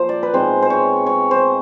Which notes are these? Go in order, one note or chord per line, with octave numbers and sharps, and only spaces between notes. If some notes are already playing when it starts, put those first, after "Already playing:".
Already playing: F3 A#3 C5
D5
B4
B2 G#3 C4 D#4 C5
C5
C#5
C#5
C5